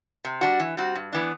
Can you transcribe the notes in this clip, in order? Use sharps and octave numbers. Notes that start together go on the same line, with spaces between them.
C3
G3 D4 F#4
E3
G3 C4 F#4
G2
E3 B3 D4